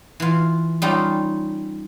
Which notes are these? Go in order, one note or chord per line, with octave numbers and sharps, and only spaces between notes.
E3 F4
G3 C#4 D#4 F4 G4